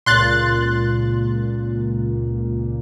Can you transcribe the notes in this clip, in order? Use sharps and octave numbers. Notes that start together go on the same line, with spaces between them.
C#2 A#2 C6 F#6 A6